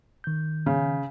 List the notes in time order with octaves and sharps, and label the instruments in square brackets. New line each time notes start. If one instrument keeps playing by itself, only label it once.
[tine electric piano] D#3 G6
[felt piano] C#3